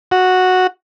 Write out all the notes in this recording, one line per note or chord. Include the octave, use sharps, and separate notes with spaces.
F#4